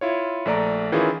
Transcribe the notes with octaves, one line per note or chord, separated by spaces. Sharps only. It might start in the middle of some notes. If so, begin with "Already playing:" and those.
E4 F4 C#5
A#1 A3 D5 A#5
D#3 E3 C#4 E4 F4 G#4